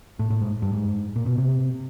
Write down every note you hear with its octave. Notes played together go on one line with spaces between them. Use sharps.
A2
A2
G#2
G2
G#2
A#2
B2
C3